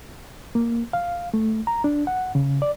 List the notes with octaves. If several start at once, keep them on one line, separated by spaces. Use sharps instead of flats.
A#3
F5
A3
A#5
D4
F#5
C#3
D5